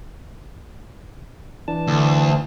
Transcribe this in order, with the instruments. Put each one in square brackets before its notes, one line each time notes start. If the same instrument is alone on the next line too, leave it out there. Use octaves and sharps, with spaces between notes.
[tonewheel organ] E3 D4 A5
[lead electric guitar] D2